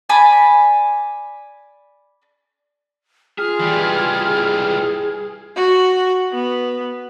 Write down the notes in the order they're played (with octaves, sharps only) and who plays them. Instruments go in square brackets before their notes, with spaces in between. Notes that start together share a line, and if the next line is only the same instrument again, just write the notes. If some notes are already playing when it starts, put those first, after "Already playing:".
[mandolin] D5 G#5 B5
[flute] F4 [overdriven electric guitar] G#4 [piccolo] F6
[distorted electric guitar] E3 G3
[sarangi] F#4
B3